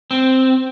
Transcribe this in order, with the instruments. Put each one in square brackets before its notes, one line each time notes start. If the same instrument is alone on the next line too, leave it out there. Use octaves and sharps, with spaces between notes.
[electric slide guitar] C4